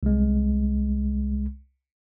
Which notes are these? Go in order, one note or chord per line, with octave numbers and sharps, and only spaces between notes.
C2 G#3